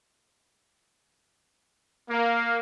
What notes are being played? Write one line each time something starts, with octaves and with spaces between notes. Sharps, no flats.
A#3